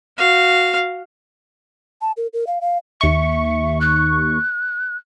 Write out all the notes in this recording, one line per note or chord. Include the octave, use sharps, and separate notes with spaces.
F#4 F5
A5
A#4
A#4
F5
F5
D#2 E5 C#6
F#6